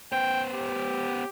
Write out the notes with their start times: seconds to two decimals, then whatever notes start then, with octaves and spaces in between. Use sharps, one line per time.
0.12 B3 C5 G5
0.54 G4